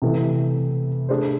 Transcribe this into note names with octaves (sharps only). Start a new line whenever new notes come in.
C3 E3 A3 E4
A3 D4 G#4 C5